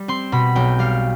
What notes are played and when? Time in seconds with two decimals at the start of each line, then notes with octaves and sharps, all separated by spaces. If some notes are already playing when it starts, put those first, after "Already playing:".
Already playing: G3
0.08 C4 C6
0.32 B2 B5
0.55 B1 G5
0.79 G3 F5